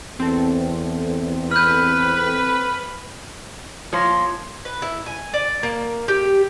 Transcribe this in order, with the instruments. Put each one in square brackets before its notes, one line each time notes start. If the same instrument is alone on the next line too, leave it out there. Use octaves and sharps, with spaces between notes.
[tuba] E2 [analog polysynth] C4 A4
[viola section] B4 [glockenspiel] F6 G6
[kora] F3 A#3 [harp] C#5 C6 A#6
[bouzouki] B4
E4
G#5
D5
A#3
G4